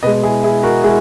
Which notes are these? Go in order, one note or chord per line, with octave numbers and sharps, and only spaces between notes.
B2 G#3 B4 D#5
E4 G#4
E4 G#4
F#4 A#4
G#3 E4 G#4